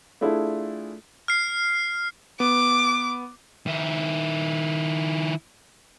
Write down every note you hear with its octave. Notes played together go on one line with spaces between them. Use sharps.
A3 D4 E4 F4 G#4 A4
F6 C7
B3 D6
D#3 E4